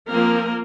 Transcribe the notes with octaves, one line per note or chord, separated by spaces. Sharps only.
F3 A#3 C4 A#4